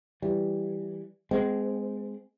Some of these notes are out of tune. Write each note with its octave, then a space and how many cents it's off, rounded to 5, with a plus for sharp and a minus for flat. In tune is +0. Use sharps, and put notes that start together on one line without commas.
E3 +0 G3 +0
G#3 +0 C4 -35